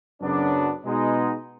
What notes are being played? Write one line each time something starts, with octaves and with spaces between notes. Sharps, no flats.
F#2 C#3 F#3 B3 D4
B2 G#3 B3 D#4